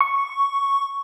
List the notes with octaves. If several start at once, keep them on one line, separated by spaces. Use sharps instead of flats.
C#6